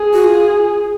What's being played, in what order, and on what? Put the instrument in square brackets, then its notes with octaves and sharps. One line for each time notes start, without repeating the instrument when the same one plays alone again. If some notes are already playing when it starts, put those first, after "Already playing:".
Already playing: [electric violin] G#4
[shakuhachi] F#4
F4